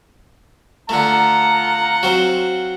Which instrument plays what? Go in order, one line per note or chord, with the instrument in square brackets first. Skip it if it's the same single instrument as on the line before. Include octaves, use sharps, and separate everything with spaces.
[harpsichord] D3 A3 [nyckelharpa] F4 F#5 [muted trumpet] A#5
[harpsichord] F#3 C4